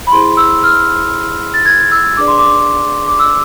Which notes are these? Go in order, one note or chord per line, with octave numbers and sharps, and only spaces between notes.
B5
E4 G#4 C5 C6
E6
F6
A6
G#6
E6
D4 G#4 B4 D5 D6
C6
D6
D6
E6